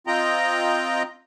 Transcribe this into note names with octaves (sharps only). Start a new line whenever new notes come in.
C4 F4 D#5 G5 A#5